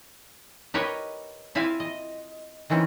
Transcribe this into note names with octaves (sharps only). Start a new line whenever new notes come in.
G4 A#4 B4 C#5 D#5
C4 E4 F4 E5 F5 G#5
D#5
D#3 E3 C4 C#4